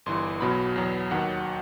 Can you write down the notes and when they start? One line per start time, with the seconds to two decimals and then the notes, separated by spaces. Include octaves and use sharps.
0.06 G1 G2 E3 C6
0.41 B1 B2 F#3 B5
0.76 E2 B2 F#3
1.11 D#2 D#3 F#3 F#5